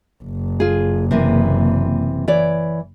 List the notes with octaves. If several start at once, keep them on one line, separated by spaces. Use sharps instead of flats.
F#1
F4 G#4
C3 E3 A#3
E3 C#5 D5